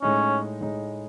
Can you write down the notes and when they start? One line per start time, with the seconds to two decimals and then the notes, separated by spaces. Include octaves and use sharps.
0.02 A2 G#3 C#4 D#4
0.61 A2 G#3 D#4